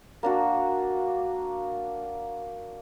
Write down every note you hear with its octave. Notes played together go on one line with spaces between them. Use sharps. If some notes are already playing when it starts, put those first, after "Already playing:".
A#3 D4 F#4